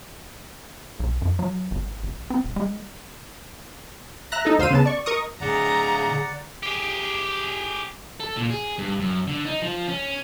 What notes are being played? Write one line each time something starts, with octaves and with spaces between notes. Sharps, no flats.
B1
F#2
F#3
G#1
A1
C4
E1
G#3
E5 A#5 F#6 A#6
D#4 A4
D2 C5 F5 E6 D#7
C#3 B3 A5
D5 C#6
A#4 D#5 C#6 D#6
A2 D3 G#4 D5 F#5 A#5
G4 G#4
A4
A#2
G#4
G2
F#2
D3
D#4
F3
C#4